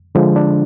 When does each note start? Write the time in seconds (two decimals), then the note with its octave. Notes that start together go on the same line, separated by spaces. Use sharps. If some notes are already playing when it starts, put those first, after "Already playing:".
0.15 D3 F3 G#3
0.36 D4